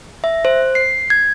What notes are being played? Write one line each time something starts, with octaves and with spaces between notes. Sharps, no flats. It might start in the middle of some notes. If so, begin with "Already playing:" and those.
E5
C5
C7
G#6